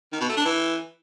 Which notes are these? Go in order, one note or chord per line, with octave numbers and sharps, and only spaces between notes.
D#3
B2
A3
D4
E3